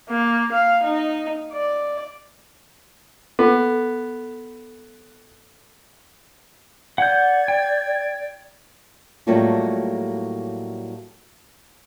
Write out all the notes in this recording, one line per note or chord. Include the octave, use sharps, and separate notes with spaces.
A#3
F5
D#4
D5
B3 A4
D5 F#5 G6 G#6
G5
A2 F#3 G3 A3 A#3 F4